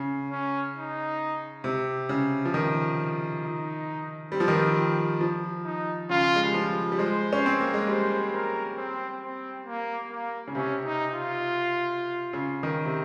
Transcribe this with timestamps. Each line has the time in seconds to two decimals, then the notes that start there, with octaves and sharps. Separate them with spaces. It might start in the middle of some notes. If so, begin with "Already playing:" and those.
Already playing: C#3
0.31 C#4
0.76 D#4
1.64 C3
2.09 C#3
2.45 F3
2.54 D#3
3.43 D#4
4.31 G3 C4
4.40 F3
4.48 D#3
4.56 F3
5.21 F3
5.65 D#4
6.09 C#3 F4
6.36 G#3
6.45 G3
6.54 F3
6.92 G3
6.98 G#3 C5
7.33 C#4
7.46 C4
7.61 A#3
7.74 G#3
7.88 G3 C5
8.33 A#4
8.77 C4
9.21 C4
9.66 A#3
10.11 A#3
10.47 C#3
10.55 C3 C#4
10.85 D#4
11.14 F4
12.33 C#3
12.63 D#3
12.85 C3